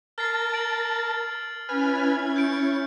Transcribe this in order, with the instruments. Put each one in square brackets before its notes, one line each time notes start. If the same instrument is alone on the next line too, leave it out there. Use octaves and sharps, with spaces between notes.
[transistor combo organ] A#4 A5 [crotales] F6 A6 C7
[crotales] D7 F#7
[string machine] C#4 E4 G#6 [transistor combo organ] B4 G#5 F6
[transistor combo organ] C#5 [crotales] G6 D7